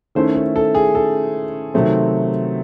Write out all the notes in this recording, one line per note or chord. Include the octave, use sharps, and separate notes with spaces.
D#3 A3 C#4 E4 C5
A4
A4
G#4
A4
C3 D#3 F#3 A3 C4